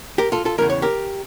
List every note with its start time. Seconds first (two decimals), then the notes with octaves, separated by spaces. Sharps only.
0.18 G4 A#4
0.32 F4 A4
0.45 F4 A4
0.58 E2 C#3 E3 A#4
0.70 C#5
0.82 G4 A#4